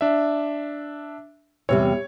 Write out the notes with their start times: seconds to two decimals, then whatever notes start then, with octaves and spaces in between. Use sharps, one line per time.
0.01 D4 E5
1.69 E2 C3 G3 C#5